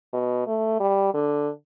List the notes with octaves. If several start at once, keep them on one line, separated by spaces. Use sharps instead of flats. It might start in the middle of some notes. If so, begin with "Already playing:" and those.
B2
A3
G3
D3